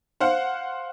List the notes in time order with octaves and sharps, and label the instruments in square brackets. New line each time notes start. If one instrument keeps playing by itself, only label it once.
[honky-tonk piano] C5 F5 F#5